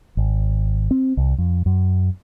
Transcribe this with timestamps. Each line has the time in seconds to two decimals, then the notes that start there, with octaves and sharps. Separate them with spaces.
0.17 G#1
0.91 C4
1.17 C2
1.38 F2
1.66 F#2